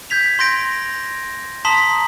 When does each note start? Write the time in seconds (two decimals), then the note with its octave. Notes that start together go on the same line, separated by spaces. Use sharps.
0.10 G6 G#6 B6 F7
0.39 C6 G6 A#6 D7
1.65 A5 A#5 C6 D#6 B6 F#7